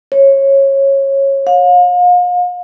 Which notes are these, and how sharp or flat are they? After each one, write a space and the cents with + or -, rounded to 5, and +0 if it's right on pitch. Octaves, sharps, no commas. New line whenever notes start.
C#5 -20
F5 +40